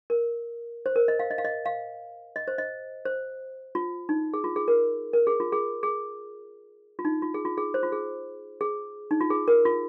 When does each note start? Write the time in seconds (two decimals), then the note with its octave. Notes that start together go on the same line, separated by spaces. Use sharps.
0.10 A#4
0.86 C5
0.96 A#4
1.08 D#5
1.19 F5
1.31 D#5
1.38 F5
1.45 D#5
1.66 F5
2.36 D#5
2.48 C5
2.58 D#5
3.05 C5
3.75 F4
4.09 D#4
4.34 G#4
4.44 F4
4.56 G#4
4.68 A#4
5.13 A#4
5.27 G#4
5.40 F4
5.52 G#4
5.83 G#4
6.99 F4
7.05 D#4
7.22 F4
7.34 G#4
7.45 F4
7.58 G#4
7.74 C5
7.83 F4
7.92 G#4
8.61 G#4
9.11 D#4
9.21 F4
9.30 G#4
9.48 A#4
9.65 F4